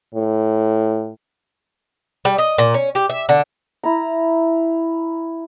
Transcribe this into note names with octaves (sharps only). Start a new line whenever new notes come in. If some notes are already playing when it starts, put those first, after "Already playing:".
A2
G3
D#5
A#2
C#4
G4
E5
D3
E4 A#5